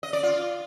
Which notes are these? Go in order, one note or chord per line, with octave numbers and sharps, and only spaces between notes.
D#5
D5
F4